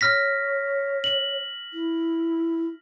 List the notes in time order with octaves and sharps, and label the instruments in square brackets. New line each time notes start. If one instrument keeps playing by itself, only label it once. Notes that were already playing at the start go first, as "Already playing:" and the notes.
[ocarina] C#5 [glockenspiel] F6 A#6 B6
[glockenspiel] F#7
[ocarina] E4